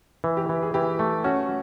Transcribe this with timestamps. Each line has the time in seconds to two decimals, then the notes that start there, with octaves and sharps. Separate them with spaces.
0.24 E3
0.37 G4
0.49 E3
0.62 G#4
0.74 E3 G4
0.99 A3
1.24 C#4 F#4